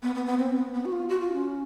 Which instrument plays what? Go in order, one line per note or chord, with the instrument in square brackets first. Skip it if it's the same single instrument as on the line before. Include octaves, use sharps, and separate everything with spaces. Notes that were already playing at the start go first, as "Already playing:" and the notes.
[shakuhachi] B3
B3
B3
C4
B3
B3
F#4
F4
F#4
F4
C#4